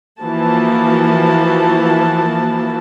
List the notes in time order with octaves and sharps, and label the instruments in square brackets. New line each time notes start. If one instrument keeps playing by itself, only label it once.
[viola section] E3 F3 A#3 F#4 A5